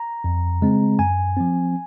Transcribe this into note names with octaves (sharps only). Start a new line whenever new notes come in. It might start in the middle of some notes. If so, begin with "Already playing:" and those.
Already playing: A#5
F2
C#3 G#3 C4
F#2 G#5
F3 C4